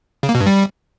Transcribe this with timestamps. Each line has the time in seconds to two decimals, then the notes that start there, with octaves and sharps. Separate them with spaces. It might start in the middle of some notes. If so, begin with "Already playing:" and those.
0.23 C#3
0.29 A#3
0.35 B2
0.41 G2
0.46 G3